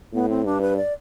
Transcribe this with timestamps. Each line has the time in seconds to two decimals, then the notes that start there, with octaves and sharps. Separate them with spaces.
0.13 A2 B3
0.29 C4
0.45 G2 D4
0.61 B4
0.76 D5